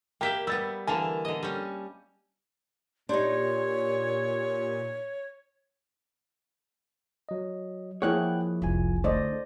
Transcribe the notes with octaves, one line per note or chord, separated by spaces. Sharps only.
A#3 G4 E5 G5 B6
G3 B3 E6 A6
D3 E3 A#3 G#5 A5
D3 D#5
G3 C#4
A#2 D4 D#4 G4 C#5 C6
F#3 D#5
F3 A#3 E4 G#4 C#5 F#5 G5 F#6
F1 C2 F4 G#5
D3 A3 C5 D5 D#5